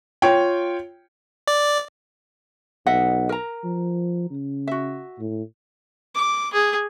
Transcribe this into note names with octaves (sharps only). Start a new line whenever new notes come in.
F4 C#5 G5
D5
B1 D#5 E5 F#5
A#4 A#5
F3
C#3
F#4 E5
A2
D6
G#4